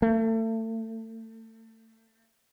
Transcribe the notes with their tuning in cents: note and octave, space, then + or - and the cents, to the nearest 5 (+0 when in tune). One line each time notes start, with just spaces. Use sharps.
A3 +30